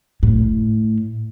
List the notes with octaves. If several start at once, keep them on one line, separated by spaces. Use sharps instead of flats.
A2